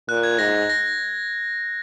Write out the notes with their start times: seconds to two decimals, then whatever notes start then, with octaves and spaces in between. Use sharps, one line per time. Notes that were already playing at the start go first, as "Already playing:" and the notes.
0.09 A#2 F#6
0.23 G#6
0.39 G#2 A#6
0.70 A#6